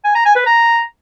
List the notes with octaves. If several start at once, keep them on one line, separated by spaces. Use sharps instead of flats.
G#5
A#5
G#5
B4
A#5